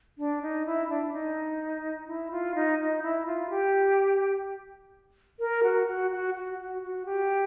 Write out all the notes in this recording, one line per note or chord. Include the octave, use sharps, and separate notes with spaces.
D4
D#4
E4
D4
D#4
E4
F4
D#4
D#4
E4
F4
G4
A#4
F#4
F#4
F#4
F#4
F#4
F#4
G4